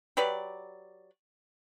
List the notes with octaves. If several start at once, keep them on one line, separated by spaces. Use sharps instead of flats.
F#3 G4 B4 D5